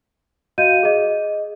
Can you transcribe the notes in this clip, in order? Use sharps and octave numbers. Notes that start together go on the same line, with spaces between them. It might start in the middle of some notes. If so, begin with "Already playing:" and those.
F#4 D#5 F5 G6 D#7
G#4 D#5